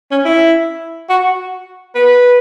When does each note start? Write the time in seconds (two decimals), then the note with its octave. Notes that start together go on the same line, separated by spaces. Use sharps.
0.11 C#4
0.25 E4
1.09 F#4
1.95 B4